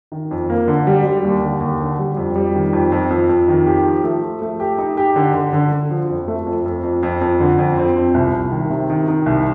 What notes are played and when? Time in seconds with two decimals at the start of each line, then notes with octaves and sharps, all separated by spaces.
0.12 D#3
0.31 F2
0.50 A#3
0.68 D3
0.87 G3
1.05 G3
1.24 D#2
1.42 D3
1.61 D#2
1.80 D3
1.99 G3
2.17 F2
2.36 G3
2.55 D#3
2.73 F2
2.92 F2
3.10 F2
3.29 F2
3.48 D#3
3.66 G4
3.85 F3
4.04 A3
4.23 F3
4.42 A3
4.60 G4
4.78 D#4
4.97 G4
5.16 D3
5.34 D3
5.53 D3
5.72 D3
5.91 F3
6.09 F2
6.28 A3
6.47 F2
6.66 F2
6.83 F2
7.03 F2
7.21 F2
7.40 D3
7.59 F2
7.78 C4
7.96 F2
8.14 C2
8.33 C2
8.51 D#3
8.70 C3
8.90 D#3
9.08 D#3
9.26 C2